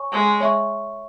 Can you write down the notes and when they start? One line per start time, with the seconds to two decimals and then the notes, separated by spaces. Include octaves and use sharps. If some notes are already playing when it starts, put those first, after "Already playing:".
Already playing: C#5 G#5 C#6
0.12 G#3
0.40 C#5 E5 C#6